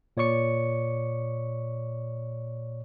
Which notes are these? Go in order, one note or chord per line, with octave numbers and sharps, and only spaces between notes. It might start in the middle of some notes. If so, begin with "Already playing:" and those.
A#2 C#5 D5 C#6 C#7